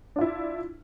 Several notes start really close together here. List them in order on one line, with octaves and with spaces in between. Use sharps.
D4 F4 E4